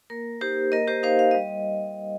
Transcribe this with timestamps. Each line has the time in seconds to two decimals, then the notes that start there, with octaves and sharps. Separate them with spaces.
0.10 A#3 A#4
0.41 D#4 G4 C5
0.72 A#3 A#4 D#5
0.87 G4 C5
1.03 D#4 C5 F5
1.19 F5
1.31 G3 D#5